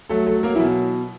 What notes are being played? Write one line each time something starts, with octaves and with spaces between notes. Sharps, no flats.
F#3 A3 A4
F#3 A3 A4
F#3 A#3 A#4
E3 E4
B2